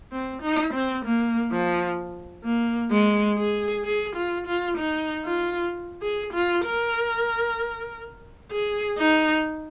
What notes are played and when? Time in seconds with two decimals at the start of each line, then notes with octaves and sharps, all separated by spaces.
0.12 C4
0.42 D#4
0.74 C4
1.05 A#3
1.51 F3
2.44 A#3
2.91 G#3
3.39 G#4
3.85 G#4
4.16 F4
4.47 F4
4.78 D#4
5.24 F4
6.02 G#4
6.33 F4
6.65 A#4
8.52 G#4
8.98 D#4